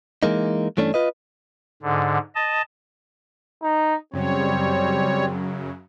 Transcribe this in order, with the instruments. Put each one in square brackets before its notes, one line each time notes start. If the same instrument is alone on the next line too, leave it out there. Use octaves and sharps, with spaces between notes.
[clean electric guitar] E3 G#3 A#3 D#4
G2 E3 A3 C#4 D4
F4 B4 D#5
[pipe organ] G#2 D3
D#5 A5
[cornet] D#4
[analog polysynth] F#2 C#3 F#3 [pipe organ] G3 C#5 [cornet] C4